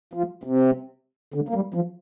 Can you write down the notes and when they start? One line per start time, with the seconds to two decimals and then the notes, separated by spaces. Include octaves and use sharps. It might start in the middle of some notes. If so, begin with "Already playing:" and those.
0.13 F3
0.43 C3
1.34 D3
1.49 A#3
1.54 G3
1.74 F3